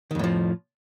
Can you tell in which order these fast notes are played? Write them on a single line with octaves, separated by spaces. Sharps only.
D#3 F2 A2 F3